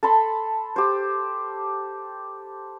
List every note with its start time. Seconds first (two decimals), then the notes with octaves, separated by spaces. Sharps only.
0.03 A4 A5 B5 C6
0.76 G4 C5